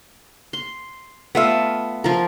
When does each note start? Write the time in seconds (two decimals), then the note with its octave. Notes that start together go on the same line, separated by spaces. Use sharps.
0.53 C6
1.35 A3 B3 F4 E5
2.04 F3 A#4